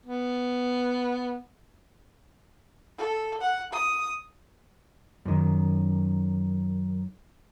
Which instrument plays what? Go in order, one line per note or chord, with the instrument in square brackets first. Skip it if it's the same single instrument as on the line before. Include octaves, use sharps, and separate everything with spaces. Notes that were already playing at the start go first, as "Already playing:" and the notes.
[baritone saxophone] B3
[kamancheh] A4
F#5
D#6
[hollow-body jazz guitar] F#2 D#3